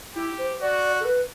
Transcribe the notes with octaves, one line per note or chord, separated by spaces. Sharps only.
E4 G4
C5
F#4 D5
A4
B4